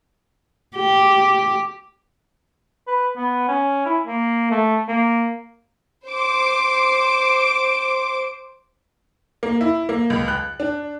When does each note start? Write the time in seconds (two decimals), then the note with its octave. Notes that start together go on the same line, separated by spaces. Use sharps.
0.76 G4
2.87 B4
3.17 B3
3.48 C#4
3.86 E4
4.07 A#3
4.51 A3
4.88 A#3
6.08 C5 D6
9.43 A#3
9.61 E4
9.89 A#3
10.10 C#2
10.28 F#6
10.60 D4